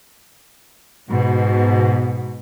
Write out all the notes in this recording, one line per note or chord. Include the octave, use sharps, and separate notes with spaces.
G#2 B2